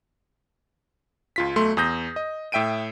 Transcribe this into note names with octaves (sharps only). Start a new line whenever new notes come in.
C#2 F4 B6
B1 A3 C6
E2 D#6 G6 A#6
D#5
A2 E5 G5 D7 D#7